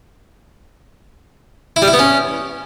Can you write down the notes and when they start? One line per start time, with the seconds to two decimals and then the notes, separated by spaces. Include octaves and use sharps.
1.76 E4
1.82 G3
1.88 E4
1.93 B3
1.99 C#4